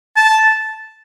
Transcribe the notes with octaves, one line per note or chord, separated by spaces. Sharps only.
A5